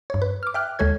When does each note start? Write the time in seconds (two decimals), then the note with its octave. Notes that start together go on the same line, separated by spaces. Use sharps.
0.10 G2 C#5
0.22 B4
0.43 D6 F6
0.54 E5 G5 F6 F#6
0.79 D#2 G#3 A4 C#5 G#6